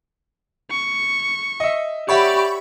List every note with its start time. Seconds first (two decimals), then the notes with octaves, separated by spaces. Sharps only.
0.71 C#6
1.60 D#5 E5
2.09 G4 C#5 D5 E5 F#5 B5 C#6